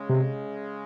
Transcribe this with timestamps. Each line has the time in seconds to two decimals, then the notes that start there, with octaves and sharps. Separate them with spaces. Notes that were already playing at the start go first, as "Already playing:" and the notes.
Already playing: C#3 G#3 C#4
0.10 C3